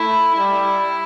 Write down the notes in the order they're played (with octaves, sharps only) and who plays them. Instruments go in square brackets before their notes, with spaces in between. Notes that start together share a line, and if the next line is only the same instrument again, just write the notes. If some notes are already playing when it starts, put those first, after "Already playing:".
Already playing: [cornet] A3 [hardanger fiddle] E4
[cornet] G3 [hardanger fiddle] E4